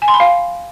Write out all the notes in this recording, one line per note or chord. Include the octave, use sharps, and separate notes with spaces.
G#5
C6
B5
F5